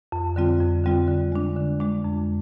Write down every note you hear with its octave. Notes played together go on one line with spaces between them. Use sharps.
F2
D3 G3 C4 F4
F2
D3 G3 C4 F4
D3
G#3 D4
D3
G#3 D4
F2